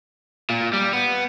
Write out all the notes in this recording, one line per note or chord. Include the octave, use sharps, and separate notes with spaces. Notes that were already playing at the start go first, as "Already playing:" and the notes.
A#2
G3
B3